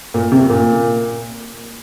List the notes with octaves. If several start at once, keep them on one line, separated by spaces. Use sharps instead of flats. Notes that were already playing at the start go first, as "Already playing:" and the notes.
A#2
C3
A#2